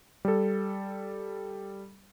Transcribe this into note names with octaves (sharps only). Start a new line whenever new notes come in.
G3 A4